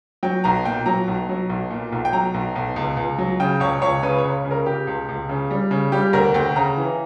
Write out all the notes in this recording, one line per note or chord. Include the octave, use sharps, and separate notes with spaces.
F#3 G5
B1 A#5
A#2 G5
F#3 A#5
B1
F#3
B1
A#2
B1
G5
F#3 A#5
B1
B1
C#2
C#2
F#3
C#3 G5
C#2 C#5
C#2 C#5
C#3 B4
C#5
C#2
C#3
A#4
C#3 G4
C#2
C#2
C#3
G3
C#3
G3 G4
D2 A#4
D2 G5
C#3 A#5
E3